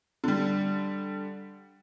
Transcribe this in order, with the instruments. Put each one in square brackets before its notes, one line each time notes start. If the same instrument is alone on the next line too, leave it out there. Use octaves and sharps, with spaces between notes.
[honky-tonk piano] D3 G3